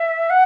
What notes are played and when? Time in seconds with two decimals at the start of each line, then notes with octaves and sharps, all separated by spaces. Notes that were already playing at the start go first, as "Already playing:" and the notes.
Already playing: E5
0.30 F#5